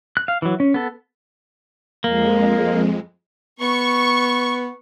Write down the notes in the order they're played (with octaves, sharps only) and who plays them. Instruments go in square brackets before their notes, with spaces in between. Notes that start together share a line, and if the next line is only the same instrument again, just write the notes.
[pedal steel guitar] F#6
F5
E3 F#3
C#4
B3 A4
[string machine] F2 G#3 [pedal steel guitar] A#3
[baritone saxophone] B3 [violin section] C#6